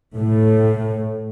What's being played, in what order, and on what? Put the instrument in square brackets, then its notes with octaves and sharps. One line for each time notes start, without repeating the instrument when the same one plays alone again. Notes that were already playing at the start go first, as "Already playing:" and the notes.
[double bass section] A2